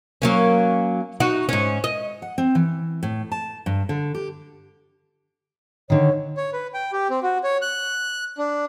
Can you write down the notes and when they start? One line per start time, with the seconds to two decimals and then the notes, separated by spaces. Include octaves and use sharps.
0.22 F#3 A#3 C#4
1.20 D#4 F#4
1.49 G#2 C#4
1.84 D#5
2.22 F#5
2.38 C4
2.55 E3
3.03 A2
3.32 A5
3.66 G2
3.89 D3
4.15 G4
5.90 D3 D#3 C#5
6.37 C#5
6.53 B4
6.74 G5
6.92 G4
7.10 C4
7.23 F#4
7.44 C#5
7.62 F#6
8.38 D4